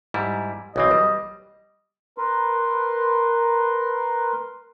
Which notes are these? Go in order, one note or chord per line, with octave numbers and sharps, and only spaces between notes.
G#2 G3 E4
B1 E3 C4 D#5
G3
A#4 B4 C6